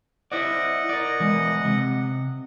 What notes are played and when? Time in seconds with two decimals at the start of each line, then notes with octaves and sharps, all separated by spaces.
0.32 E4 C5 D5 D#5 F#5
0.89 A#4 D5
1.20 E3 G#3
1.65 C3